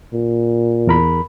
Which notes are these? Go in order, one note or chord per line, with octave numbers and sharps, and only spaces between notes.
A#2
E2 A#4 B5